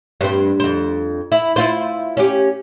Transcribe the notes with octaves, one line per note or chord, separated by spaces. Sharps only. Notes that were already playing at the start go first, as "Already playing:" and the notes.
G2 C4
F2 C5
E4
E4 F4 C5
C#4 G4